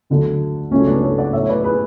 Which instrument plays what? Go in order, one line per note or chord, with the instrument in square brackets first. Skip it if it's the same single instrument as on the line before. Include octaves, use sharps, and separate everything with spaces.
[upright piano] D2 D3 F#3 A3
C#2 C#3 F#3 A3 C#4
B3 D4
A4 C#5
D5 F#5
A2 C#5 E5
F#3 A3
C#5
B4 D5
G#4 B4